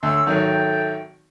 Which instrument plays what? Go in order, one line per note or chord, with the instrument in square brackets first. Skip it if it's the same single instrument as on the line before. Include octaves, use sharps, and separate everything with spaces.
[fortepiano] D2 [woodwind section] C#5 C6 E6
[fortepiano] G#1 D#3 F#3 [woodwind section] A4 E5 G5